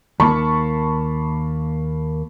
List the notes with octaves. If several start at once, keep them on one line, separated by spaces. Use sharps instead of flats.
D#2 A#3 A5 B5 C#6